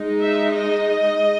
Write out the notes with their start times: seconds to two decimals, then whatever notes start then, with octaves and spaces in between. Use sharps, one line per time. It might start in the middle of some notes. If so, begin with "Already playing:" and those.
Already playing: G#3 D#4
0.22 E5
0.54 D#5